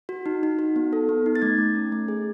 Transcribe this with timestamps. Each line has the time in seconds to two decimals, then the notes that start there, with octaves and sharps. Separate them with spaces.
0.09 F#4
0.26 D#4
0.43 D#4
0.59 F#4
0.76 B3
0.93 A4
1.09 B3
1.26 D#4
1.35 A6
1.42 A3 G#6
1.58 A3
1.76 C#4
1.92 A3
2.08 G#4